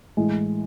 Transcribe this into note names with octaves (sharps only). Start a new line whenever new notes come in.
A2 E3 G#3